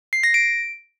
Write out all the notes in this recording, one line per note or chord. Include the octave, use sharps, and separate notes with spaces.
C7
A#6
D7